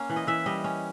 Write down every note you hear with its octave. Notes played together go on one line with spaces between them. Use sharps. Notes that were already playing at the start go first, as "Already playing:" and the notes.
Already playing: A#3 C#4
E3
D#5
E3 E5
G3 D#5
C#4